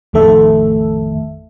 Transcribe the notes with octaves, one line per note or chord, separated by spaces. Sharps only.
A1 F2 D#3 A3 A4 E5